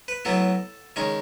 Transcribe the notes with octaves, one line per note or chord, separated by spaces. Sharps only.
B4
A2 F#3 B3 A4
D#3 G#3 C#4